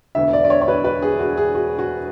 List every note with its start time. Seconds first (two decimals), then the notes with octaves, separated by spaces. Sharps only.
0.15 E1 D2 D3 E5
0.33 D5
0.44 D5
0.50 C#5
0.61 C#5
0.68 B4
0.84 B4
1.02 G#4
1.19 F#4
1.37 G#4
1.55 F#4
1.79 F#4